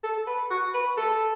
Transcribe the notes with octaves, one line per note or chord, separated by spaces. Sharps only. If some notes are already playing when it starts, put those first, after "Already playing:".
A4
B4
F#4
B4
A4